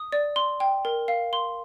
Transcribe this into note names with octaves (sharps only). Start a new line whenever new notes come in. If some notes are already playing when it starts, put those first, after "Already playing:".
Already playing: D#6
D5
C6
G5
A#4
F5
C6